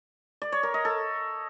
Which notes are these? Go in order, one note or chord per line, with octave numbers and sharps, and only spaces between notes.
D5
C#5
A#4
D#5
A4